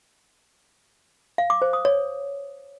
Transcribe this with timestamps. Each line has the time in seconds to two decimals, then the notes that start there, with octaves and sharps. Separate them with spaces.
1.38 F5
1.50 D6
1.62 C5
1.73 D#6
1.85 C#5